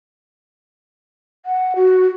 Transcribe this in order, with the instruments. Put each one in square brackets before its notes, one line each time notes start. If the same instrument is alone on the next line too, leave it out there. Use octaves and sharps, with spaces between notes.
[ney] F#5
F#4